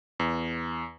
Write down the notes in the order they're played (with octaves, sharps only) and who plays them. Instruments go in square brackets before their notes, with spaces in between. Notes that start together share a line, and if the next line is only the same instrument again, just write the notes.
[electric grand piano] E2